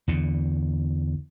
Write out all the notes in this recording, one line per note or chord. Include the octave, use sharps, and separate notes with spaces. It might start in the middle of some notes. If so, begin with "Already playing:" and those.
E2 D3